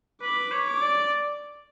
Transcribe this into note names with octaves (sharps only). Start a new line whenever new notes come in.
B4 D6
C#5
D6
D5